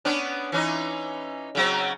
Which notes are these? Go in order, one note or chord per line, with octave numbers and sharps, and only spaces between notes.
B3 C#4 D4
E3 C#4 D#4
C#3 F#3 C4